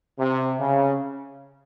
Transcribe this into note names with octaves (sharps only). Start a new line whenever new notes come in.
C3
C#3